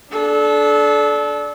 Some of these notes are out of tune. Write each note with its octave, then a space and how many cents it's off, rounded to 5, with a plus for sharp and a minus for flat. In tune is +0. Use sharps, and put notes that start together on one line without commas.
D4 -5 A4 -30